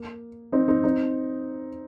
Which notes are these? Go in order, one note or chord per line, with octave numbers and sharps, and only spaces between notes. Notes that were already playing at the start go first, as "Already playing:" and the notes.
Already playing: A#3
C4 D#4
C4 D#4
C4 D#4